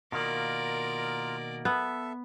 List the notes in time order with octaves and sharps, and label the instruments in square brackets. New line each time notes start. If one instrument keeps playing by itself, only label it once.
[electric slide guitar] B2 D#3 A#3 [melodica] F4 A#5 [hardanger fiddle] A#4 D5
[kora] B3 [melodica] A4 E5